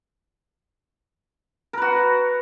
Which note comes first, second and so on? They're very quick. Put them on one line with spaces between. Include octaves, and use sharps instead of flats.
A#4 B4 F#4